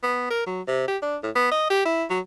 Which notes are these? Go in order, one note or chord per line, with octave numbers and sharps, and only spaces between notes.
B3
A#4
F#3
C3
G4
D4
A2
B3
D#5
G4
E4
F#3